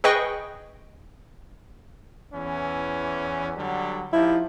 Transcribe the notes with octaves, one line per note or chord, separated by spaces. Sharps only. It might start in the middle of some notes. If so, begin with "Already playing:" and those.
G#4 B4 D#5 G5 C#6
E2 E3 C#4
D3 F#3 G3
F3 D#4 E4 G4